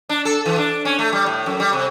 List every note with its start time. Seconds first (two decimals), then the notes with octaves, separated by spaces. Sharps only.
0.09 D4
0.25 A4
0.46 E3
0.58 D4
0.85 C#4
0.99 A3
1.13 G3
1.26 A2
1.46 F#2
1.60 G3
1.73 C3